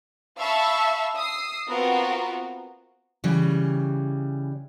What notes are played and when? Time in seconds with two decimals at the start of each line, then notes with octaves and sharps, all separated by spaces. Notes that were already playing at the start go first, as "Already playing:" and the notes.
0.40 E5 F5 A5 B5 C#6 E6
1.16 D#6 E6 C7
1.68 B3 C4 F4 F#4 A#4 B4
3.24 C#3 E3 G3